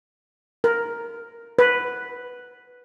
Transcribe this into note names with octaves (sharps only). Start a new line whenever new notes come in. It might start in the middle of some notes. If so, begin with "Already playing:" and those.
A#4
B4